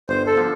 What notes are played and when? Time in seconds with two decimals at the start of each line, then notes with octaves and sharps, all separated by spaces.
0.09 G1 C5
0.27 A4
0.37 D3 F3